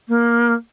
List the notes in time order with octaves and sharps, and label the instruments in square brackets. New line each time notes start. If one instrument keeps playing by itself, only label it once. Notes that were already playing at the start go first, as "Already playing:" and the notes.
[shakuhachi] A#3